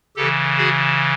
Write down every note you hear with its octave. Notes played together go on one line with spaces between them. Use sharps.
C#3 G4 A4
E3
F#4 G#4